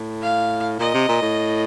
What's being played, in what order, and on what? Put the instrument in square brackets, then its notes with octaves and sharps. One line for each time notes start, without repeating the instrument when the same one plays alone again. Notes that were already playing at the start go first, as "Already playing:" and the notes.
Already playing: [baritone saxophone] A2
[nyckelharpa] F5
[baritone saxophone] A#2 [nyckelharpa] D#5
[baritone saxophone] C3
A#2
A2